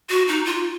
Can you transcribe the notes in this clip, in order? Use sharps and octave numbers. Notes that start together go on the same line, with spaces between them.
F#4
D#4
F4